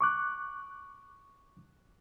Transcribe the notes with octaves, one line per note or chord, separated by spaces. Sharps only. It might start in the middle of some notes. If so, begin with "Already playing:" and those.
C#6 D6 F#6